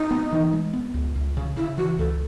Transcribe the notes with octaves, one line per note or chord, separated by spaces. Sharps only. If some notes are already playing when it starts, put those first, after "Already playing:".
Already playing: D#4
B3
E3
G#3
B3
C#2
C#2
C#3
C#3 E4
E3 F#4
C#2 A4